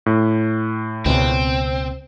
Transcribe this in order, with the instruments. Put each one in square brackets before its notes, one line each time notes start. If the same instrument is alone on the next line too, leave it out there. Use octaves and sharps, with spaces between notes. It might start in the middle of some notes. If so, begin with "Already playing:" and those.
[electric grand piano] A2
[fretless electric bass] C#2 B2 [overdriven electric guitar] C4